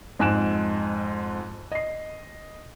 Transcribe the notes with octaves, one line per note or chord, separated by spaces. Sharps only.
F2 G#2 G#5 F#6 D7 E7
D#5 C7